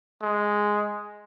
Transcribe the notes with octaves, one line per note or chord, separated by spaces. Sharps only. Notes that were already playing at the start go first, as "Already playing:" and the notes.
G#3